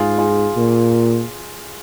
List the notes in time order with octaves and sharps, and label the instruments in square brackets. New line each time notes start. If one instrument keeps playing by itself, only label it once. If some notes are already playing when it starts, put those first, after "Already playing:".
Already playing: [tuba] G#2 [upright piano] F4 G#4
[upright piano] F4 G#4
[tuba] A#2